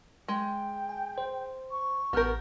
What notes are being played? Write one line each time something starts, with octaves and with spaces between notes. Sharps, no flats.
G#3 G5
G#5
C5
C#6
A1 B3 A#4 F6 G6